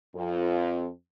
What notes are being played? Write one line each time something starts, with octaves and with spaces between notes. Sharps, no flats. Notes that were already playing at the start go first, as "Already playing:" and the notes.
F2